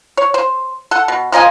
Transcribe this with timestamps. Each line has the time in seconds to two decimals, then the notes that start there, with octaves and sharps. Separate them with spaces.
0.17 C#5
0.34 C5
0.91 A4 F#5
1.08 B2
1.32 F3 A#3 D#5 G#5